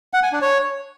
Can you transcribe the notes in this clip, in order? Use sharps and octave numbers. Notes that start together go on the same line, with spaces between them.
F#5
G#5
D4
C#5